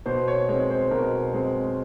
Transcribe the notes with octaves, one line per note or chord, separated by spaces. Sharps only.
B2 C5
C#5
G#3 C4 C#5
C5
B2 A#4
G#3 C4